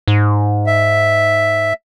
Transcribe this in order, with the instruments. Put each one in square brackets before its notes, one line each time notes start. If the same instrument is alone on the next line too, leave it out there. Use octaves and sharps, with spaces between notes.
[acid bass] G#2
[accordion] E5